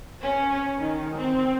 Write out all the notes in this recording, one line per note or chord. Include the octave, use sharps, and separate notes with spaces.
C#4
D#3
C4